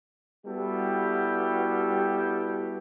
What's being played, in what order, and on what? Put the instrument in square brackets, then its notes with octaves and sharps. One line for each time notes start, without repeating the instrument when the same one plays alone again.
[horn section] G3 B3 E4 F#4 G4 A4